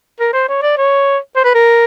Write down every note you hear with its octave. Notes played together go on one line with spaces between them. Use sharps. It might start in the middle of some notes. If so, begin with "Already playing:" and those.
A#4
C5
C#5
D5
C#5
C5
B4
A#4